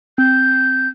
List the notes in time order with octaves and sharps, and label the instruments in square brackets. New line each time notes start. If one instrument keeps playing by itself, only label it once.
[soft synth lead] C4 [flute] G6